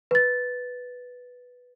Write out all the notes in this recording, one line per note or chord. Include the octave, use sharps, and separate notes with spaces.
B4 A6